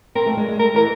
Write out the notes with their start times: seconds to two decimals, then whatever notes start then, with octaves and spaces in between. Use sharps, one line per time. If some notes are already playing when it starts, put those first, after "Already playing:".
0.15 C4 A#4
0.26 A3
0.37 G#3
0.48 G#3
0.59 A3 A#4
0.74 E3 A#4